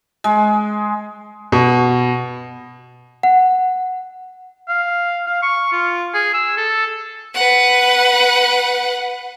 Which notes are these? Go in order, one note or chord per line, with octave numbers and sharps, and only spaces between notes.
G#3
B2
F#5
F5
F5
C#6
F4
G#4
E6
A4
B4 F#5